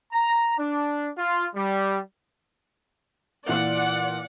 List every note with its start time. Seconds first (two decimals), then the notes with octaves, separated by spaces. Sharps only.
0.12 A#5
0.58 D4
1.17 F4
1.55 G3
3.49 A#2 E3 D5 F#5